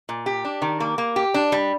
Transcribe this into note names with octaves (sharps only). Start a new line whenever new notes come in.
A#2
G4
D4
D#3
A#3
A#3
G4
D4
G3